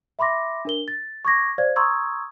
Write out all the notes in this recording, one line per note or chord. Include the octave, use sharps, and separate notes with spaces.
E5 B5 C6 D6 A#6
D4 A#4 G7
A6
C#6 D6 G#6 A#6
C5 D5 F5 G#6
A#5 C6 C#6 D#6 E6 G#6